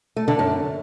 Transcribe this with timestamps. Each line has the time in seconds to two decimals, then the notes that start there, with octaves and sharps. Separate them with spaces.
0.16 A3
0.28 D3
0.39 F#2